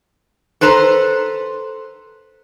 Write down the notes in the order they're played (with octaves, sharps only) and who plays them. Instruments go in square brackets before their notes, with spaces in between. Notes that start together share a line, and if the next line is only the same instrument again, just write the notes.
[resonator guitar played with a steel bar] A4 B4 C5 A#5